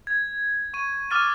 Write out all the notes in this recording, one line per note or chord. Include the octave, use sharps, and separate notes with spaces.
G#6
C#6 D#7
D6 E6 F6 A6 D#7